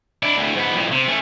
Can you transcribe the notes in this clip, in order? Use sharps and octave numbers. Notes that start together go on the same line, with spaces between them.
D4 E4
D2 A2
G#2 B3
F2 A2
C3
A3 C#4